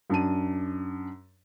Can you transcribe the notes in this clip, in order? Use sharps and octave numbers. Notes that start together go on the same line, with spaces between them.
F#2 D4 A5 D#7